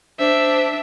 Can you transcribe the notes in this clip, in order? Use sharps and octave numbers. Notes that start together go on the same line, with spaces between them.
D4 C5 E5